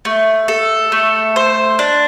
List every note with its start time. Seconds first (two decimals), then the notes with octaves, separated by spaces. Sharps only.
0.05 A3
0.48 A4
0.92 A3
1.36 C5
1.79 D4